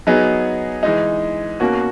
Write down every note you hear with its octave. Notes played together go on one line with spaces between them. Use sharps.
F#3 B3 D#4 G#4
E3 G#3 D#4
B2 A#3 C#4 F#4